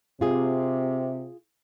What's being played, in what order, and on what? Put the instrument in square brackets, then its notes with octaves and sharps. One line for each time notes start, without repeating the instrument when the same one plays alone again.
[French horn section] C3 [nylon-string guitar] F4 G#4